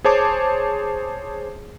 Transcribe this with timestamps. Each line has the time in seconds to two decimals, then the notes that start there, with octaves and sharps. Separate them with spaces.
0.05 G#4 C5 C#5 A5 D6